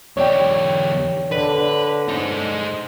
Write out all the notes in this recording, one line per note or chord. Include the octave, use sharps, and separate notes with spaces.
E2 G4 C#5 D5 G5
D3 B4
D#4 C5